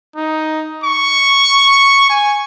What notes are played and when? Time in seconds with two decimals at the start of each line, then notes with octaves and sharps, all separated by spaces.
0.16 D#4
0.84 C#6
2.10 G#5